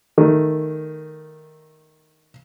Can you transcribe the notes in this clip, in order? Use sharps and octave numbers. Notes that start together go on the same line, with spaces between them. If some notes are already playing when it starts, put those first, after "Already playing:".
D#3 A3